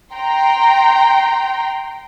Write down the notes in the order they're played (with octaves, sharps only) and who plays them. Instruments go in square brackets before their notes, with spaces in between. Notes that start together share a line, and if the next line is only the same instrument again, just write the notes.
[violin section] G5 A#5 C6